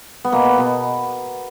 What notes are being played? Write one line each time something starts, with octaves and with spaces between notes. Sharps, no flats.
B3
B2 A#3
B3
B2 B3